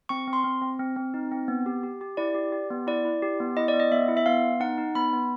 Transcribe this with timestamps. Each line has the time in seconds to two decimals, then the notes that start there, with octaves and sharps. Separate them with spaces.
0.09 C4 C#6
0.27 C4
0.33 C6
0.44 C4
0.62 C4
0.79 C4
0.96 C4
1.14 D#4
1.32 C4
1.48 B3
1.66 G4
1.83 G4
2.01 G4
2.17 E4 D5
2.35 G4
2.52 G4
2.71 B3
2.87 E4 D5
3.05 E4
3.22 G4
3.40 B3
3.57 E4 D#5
3.68 D5
3.73 B3
3.80 D#5
3.91 B3 E5
4.08 E4
4.17 E5
4.26 B3 F5
4.44 B3
4.60 D#4 F#5
4.78 D#4
4.95 B3 B5
5.13 B3